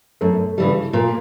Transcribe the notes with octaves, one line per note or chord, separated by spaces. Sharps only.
F#2 A3
C#3 E3 G3
A#2 A#3